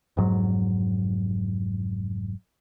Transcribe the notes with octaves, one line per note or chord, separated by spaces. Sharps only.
F1 G#2 F#3